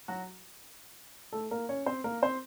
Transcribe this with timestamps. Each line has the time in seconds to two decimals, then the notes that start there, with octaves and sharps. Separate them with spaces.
0.08 F#3 F#4
1.33 A3 A4
1.51 A#3 A#4
1.69 C#4 C#5
1.86 C4 C5
2.04 A#3 A#4
2.22 C4 C5